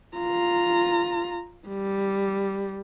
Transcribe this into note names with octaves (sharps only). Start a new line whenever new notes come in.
F4 A#5
G3